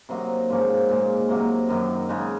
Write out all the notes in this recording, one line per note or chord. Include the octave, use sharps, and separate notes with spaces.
C3 F#3 A#3 D#4 C6
G#2 F3 A#3 C#4
A#2 G#3 D#4
C3 F#3 A#3
F#2 D#3 F#3
C#3 G#3 D#4